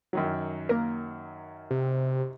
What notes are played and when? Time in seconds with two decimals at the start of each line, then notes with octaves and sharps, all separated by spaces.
0.13 F#2 D#3 F#3
0.69 A#3 A#4
1.70 C3